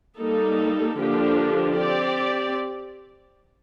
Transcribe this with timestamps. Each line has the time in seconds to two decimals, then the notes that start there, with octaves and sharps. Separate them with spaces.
0.17 G3 A#3 D#4 A4
0.97 D3 F3 A#3 D4 G4
1.77 C4 G4 D5